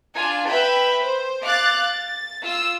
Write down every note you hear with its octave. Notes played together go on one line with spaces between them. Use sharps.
D4 F4 G#5
B4 E5 G5 B5
C5
F5 D6 F#6 A6
A6
F4 E6